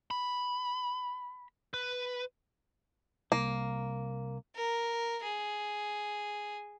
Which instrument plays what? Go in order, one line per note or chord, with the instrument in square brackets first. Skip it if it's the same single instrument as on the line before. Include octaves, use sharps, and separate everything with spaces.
[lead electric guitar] B5
B4
[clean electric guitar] C2 [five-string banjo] A#3
[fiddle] A#4
G#4